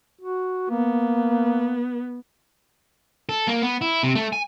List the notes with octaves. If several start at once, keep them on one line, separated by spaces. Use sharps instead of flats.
F#4
A#3 B3
A4
A#3
B3
E4
C3
A3
G#5